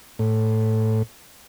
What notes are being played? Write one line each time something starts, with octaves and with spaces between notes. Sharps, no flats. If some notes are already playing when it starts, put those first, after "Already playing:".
A2